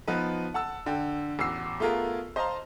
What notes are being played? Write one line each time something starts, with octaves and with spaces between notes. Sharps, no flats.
F3 B3 D#4 B4
F#5 A5 E6
D3 G5
A1 E2 F#4 E6 C7
A3 B3 F4 G#4 A#4
C5 D#5 F5 A5 A#5 C6